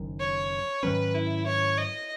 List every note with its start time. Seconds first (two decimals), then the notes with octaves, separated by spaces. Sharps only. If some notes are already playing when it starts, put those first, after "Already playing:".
Already playing: F#1 F#2 D#3
0.20 C#5
0.83 G#2 D#3 F#3 C#4 B4
1.15 E4
1.47 C#5
1.78 D#5